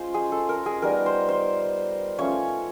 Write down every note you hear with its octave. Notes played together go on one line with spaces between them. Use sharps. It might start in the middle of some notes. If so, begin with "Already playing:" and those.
Already playing: G#3 C#4 F4 C5
G#4
A4
A#4
G#4
G3 B3 D#4 A#4
C5
C5
F3 A3 C#4 C#5